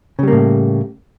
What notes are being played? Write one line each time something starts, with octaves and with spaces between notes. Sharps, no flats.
A2 C#3 G3 A#3